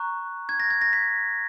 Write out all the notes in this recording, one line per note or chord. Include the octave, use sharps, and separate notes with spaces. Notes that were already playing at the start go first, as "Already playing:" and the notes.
Already playing: A#5 C#6 F#6
G#6
A#6
G#6
A#6
B6